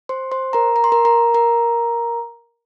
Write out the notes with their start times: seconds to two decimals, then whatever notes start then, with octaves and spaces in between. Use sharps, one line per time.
0.09 C5 C6
0.32 C5 C6
0.53 A#4 A#5
0.76 A#5
0.84 C6
0.92 A#4 A#5
1.05 A#4 A#5
1.34 A#4 A#5